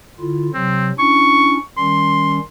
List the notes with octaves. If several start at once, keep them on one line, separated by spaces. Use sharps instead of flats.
D3 E4 F4
C3 F#3 C4
C#4 D4 E4 C#6
D#3 G3 C#4 C6